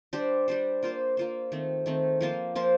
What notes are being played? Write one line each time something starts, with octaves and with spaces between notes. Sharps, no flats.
G3 D4 G4 C5
G3 D4 G4 C5
A#3 F4 C5
A#3 F4 C5
D#3 A3 C4
D#3 A3 C4
F3 A#3 F4 C5
F3 A#3 F4 C5